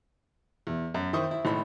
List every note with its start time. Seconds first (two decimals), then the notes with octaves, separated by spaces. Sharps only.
0.67 E2
0.94 F#2
1.13 D#3 E4 C5 C#6 D#6
1.31 E4
1.45 G#1 A2 B5